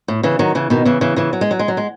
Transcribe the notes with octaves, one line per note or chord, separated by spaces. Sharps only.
A2
C#3 E3
D#3 F#3
C#3 E3
B2 D#3
C#3 E3
C#3 E3
C#3 E3
F#3
G#3
F#3
G#3
F#3
G#3